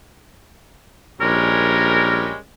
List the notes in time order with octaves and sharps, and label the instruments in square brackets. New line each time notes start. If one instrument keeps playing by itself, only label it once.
[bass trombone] A#1 [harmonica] G3 G#3 C#4 [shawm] A#4